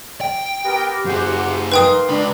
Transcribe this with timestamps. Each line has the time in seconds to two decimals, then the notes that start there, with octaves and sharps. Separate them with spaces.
0.21 G5
0.64 B3 G4 A#4
1.05 F#2 F#4 G#4 C5
1.72 A#3 D#4 B4 G5 C6 D#6
2.09 C#2 D4 B5